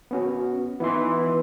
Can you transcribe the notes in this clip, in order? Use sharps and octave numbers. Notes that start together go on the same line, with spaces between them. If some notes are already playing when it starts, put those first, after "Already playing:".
B3 C#4 F#4
E3 B3 D#4 C6